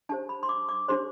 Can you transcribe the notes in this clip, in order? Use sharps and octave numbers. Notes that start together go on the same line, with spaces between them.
D4 G4 C5 A5
B5
C6
D6
D6
D4 G4 C5 C6